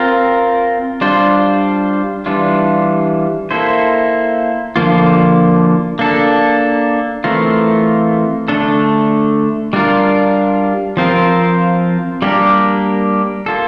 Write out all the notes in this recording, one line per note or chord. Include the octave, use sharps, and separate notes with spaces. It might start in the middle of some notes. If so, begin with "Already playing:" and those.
Already playing: C4 F4 A#4
G3 D4 F4 C5
E3 G3 D4 F4
A#3 E4 A4 C5
D3 F3 A#3 F4
A#3 D4 A4
E3 A3 C4 F4 A#4
D3 A3 D4 A4
G3 D4 F4 A#4
F3 C4 F4 A#4
G3 A#3 D4 G4 A#4
A#3 F4 A4